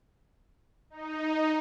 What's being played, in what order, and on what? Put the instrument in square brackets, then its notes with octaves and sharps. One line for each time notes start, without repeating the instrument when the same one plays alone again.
[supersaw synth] D#4